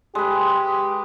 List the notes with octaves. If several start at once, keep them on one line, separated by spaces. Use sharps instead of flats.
G#3 G4 B4